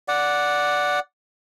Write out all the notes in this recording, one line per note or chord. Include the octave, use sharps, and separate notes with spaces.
D5 F#5